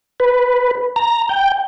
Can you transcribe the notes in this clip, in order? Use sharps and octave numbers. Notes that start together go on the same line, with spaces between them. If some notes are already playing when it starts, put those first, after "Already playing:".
B4
A#5
G5